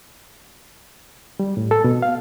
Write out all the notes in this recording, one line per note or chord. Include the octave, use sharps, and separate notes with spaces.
G3
A2
A4
B2
F5